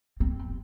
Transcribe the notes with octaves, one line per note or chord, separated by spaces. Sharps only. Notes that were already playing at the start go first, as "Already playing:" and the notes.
C4